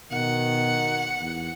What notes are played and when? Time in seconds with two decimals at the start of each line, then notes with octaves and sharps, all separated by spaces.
0.12 B2 D#3 F#5
1.21 E2